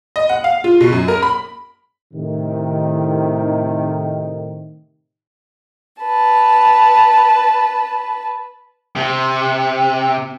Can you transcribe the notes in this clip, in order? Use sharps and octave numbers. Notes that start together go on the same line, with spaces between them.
D#5
F#5
F5
F4
B2
F#2
A#4
B5
A2 C3 D#3
B4 A5
C3